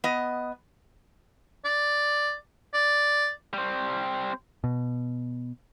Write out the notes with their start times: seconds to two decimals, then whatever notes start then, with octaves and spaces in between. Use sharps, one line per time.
0.04 B3 D#5
1.65 D5
2.74 D5
3.54 G3 C4
4.64 B2